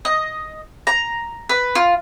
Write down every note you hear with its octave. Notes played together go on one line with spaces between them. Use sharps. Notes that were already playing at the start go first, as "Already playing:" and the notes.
D#5
A#5
B4
F4